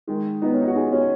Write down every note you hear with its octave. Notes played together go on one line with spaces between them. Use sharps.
D#3 G#3
B3 D#4
C#4
D#4
F#4
D#4 G#4
C#4 F#4